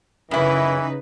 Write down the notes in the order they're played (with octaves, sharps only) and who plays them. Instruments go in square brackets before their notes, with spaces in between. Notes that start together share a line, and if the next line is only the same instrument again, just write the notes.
[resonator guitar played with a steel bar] F#2 E4 [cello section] C#3 D#4 B4 [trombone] E3